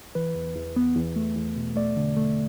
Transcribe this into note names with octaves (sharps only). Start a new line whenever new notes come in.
E3 B4
E2
E2
B3
E2
A3
E2
B2
A3 D5
D3
A3